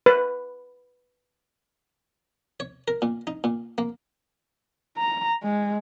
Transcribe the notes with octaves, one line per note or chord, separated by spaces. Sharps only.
B4
C#5
A#4
A#2
D#4
A#2
A#3
A#5
G#3